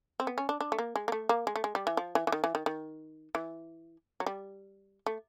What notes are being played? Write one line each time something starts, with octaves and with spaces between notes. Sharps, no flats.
C4
B3
C#4
D4
D4
A3
A#3
G#3
A#3
A3
A#3
G#3
A3
G#3
G3
E3
F3
E3
E3
D#3
E3
D#3
D#3
E3
F#3
G3
A3